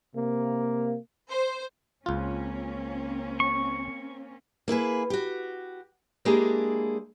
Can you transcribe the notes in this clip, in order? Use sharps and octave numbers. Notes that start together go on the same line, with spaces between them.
C3 A#3
C5
C#2 A#3 C4 C#4 F4
C#6
A#3 E4 G#4 B4
F#4 G4
G#3 A#3 D4 E4 G4 G#4